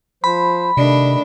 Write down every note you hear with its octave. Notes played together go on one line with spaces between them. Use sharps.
F3 C5 B5
C3 D#3 A3 D4 D#5